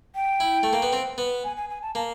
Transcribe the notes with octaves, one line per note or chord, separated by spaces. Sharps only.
G5
E4
A3
A#3
B3
C4
B3
G#5
G#5
G#5
A5
A#3 A5